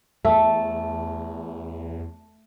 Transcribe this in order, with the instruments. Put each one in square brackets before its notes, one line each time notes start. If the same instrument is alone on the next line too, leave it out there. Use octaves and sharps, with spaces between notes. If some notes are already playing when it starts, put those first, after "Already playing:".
[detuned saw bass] E2 [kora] A3 A4